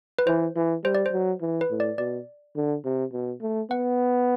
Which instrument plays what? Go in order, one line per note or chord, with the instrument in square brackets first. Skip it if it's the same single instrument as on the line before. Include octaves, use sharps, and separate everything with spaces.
[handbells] B4
[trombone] E3 [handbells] C5
[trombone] E3
[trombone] G3 [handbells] C5
[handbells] D5
C5
[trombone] F#3
E3
[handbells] B4
[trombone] A2
[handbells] D5
[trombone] B2 [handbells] D5
[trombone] D3
C3
B2
A3
[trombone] B3 [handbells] F#5